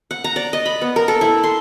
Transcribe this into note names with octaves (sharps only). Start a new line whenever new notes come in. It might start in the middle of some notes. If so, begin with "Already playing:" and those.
F#5
A#5
D5
D#5
B5
B3
A#4
A4
E4
C6